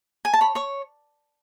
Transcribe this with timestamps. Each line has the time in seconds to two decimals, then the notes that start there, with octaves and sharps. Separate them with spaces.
0.25 G#5
0.33 A5
0.41 C#5 B5
0.55 C#5 C#6